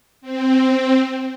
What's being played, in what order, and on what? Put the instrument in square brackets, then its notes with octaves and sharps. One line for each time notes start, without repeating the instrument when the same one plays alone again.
[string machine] C4